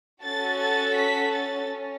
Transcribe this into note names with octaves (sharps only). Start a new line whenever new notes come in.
C#4 F#4 A4 A6
A6
B6
A6
C#4